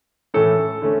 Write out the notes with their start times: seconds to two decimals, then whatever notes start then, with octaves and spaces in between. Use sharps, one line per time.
0.34 A2 E3 A3 C#4 A4
0.82 D3 A3 C#4